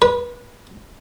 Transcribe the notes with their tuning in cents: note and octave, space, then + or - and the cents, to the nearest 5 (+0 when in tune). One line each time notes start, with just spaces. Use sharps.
B4 -30